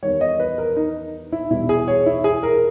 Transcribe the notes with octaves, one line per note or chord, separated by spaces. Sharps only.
E2 D#3 G3 C#5
D#5
B4
A#4
D#4
E4
E2 B2 G3 E4
G#4
C#5
E4
G#4
A#4